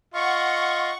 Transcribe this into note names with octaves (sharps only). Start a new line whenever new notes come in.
F4 D#5 F#5 C#6